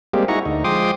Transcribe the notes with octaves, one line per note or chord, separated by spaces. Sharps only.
G3 G#3 A#3 C4 G4
D#4 E4 F#4 G#4 A#5 C#6
D2 D#4
F3 G#3 G5 C6 D6 D#6